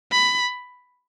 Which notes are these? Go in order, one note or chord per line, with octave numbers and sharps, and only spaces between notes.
B5